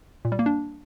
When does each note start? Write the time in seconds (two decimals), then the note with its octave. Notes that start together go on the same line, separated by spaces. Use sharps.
0.25 A#2
0.32 G3
0.39 A#3
0.46 D4